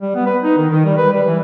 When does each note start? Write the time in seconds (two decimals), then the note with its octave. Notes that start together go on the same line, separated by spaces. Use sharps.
0.02 G3
0.15 B3
0.26 B4
0.43 D#4
0.58 D#3
0.70 D#3
0.85 G3
0.97 B4
1.13 G3
1.27 E3